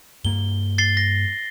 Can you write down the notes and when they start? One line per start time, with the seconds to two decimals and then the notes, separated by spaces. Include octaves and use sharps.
0.25 G2 A#3 G7
0.78 A6 C7 G7
0.97 A#6